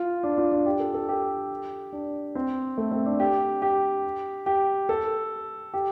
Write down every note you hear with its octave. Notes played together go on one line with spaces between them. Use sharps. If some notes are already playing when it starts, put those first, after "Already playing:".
Already playing: F4
D4
F4
D4
G4
A4
A4
G4
D4
C4
A3
C4
D4
G4
G4
G4
A4
G4